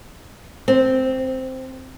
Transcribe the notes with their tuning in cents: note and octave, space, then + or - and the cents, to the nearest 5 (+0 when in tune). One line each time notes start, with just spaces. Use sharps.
C4 -5